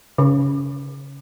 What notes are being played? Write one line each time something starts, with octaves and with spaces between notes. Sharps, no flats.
C#3